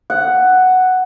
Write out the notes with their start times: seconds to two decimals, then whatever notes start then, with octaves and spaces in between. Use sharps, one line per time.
0.10 F#5